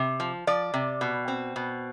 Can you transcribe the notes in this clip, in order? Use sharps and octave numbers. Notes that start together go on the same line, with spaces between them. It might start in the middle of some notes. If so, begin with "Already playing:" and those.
Already playing: C3
F3
F3 D5
C3
B2
C4
B2